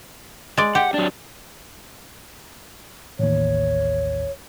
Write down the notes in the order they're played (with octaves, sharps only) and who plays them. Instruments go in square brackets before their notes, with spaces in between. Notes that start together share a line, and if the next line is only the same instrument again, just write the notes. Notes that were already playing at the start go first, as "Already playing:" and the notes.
[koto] G#3 D5
[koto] G4 [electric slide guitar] F#5
[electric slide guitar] F#3 D4
[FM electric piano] A1 D#2 [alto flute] C#5